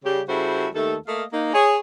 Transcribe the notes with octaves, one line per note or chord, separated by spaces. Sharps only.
C#3 G3 G4
C#3 G3 E4 F#4 A4 C5
D#2 D#3 A3 A4
A3 A#3 D#5 F5
A#3 D#4
G#4 C#5